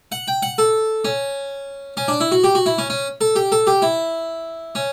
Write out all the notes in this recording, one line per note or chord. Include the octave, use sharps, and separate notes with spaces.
F#5
G5
F#5
A4
C#4
C#4
D4
E4
F#4
G4
F#4
E4
C#4
C#4
A4
G4
A4
G4
E4
C#4